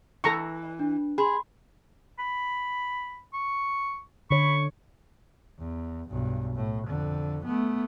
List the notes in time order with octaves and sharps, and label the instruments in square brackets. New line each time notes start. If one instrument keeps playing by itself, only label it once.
[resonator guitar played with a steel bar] E3 [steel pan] A4 A#5 C#6
[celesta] D4
[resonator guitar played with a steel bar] G#4 [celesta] B5 C6
[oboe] B5
C#6
[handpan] D3 C#5 [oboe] B5 [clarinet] C#6
[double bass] E2
B1 G2
A2
F2 D3
A3 B3